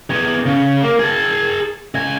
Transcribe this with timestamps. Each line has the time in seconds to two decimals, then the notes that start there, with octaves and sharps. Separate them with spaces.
0.10 B3 G#4
0.46 C#3
0.83 A#3
0.99 G#4 A5
1.95 C#2 G#5